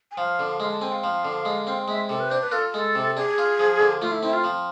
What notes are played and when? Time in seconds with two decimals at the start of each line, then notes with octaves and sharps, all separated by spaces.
0.11 G#5
0.17 F3 F5
0.39 D3
0.60 G#3 F5
0.71 A5
0.81 C4 G#5
0.93 F5
1.04 F3
1.25 D3
1.45 G#3
1.67 C4
1.88 G#3 E5
2.09 C3 A4
2.20 B4
2.30 D4 C5
2.42 B4
2.52 F4 A4
2.73 G#3 A4
2.95 C3
3.16 D4 G#4
3.38 F4
3.59 F3
3.80 D3
4.02 A3 F4
4.12 E4
4.23 C4 E4
4.33 F4
4.44 F3